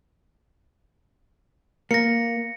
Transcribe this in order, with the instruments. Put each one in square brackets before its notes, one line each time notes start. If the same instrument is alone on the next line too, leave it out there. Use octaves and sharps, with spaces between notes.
[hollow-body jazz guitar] A#3 [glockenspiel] A#6 C#7